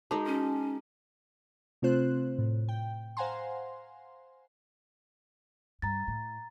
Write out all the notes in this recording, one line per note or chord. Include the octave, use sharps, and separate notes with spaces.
G#3 D#4 F#4 A5
C#4
C3 A3 C4 F4 C5 F#6
A2
G5
C5 F5 F#5 G#5 A#5 C6
G2 A#5 A6
A2